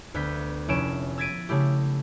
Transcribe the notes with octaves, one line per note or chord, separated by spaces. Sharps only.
D2 B3 G6 B6
F1 C#4 E4 D7 E7
E6 G#6 A6 B6 D7 D#7
C#3 A3 E4 G4